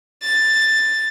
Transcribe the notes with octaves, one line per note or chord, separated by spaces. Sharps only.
A6